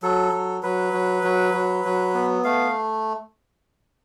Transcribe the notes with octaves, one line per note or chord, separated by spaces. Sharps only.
F#3 A4
F#3
F#3 B4
F#3
F#3
F#3
F#3
B3
A3 F5